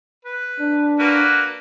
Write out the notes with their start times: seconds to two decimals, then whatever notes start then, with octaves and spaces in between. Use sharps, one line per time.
0.25 B4
0.60 D4
0.99 A#3 F#4 B4